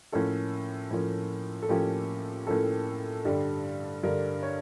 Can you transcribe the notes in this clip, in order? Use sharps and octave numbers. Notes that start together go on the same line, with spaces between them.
A2 F3 A#3 C#4 A4
A2 F3 A#3 C#4
A4
A2 F3 A#3 C#4 G4
A2 F3 A#3 C#4 A4
G2 D3 G3
G2 D3 G3 A#4
C#5